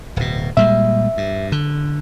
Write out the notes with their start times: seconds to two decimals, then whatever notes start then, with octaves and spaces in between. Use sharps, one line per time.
0.16 D1 B2
0.57 A#2 G3 G#3 E5
1.17 G2
1.52 D3